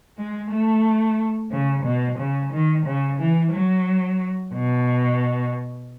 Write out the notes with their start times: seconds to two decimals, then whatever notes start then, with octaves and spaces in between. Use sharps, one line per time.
0.17 G#3
0.50 A3
1.51 C#3
1.84 B2
2.18 C#3
2.52 D#3
2.86 C#3
3.19 E3
3.53 F#3
4.54 B2